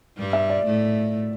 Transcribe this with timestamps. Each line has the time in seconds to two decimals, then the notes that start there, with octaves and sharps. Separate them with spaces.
0.18 G2 G3
0.33 E5
0.50 D5
0.65 A2 A3